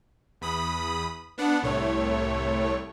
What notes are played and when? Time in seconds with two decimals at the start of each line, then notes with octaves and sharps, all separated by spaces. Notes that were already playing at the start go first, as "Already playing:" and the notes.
0.41 E2 B5 D#6
1.38 B3 D4 F#5
1.62 C2 A2 A3 C#5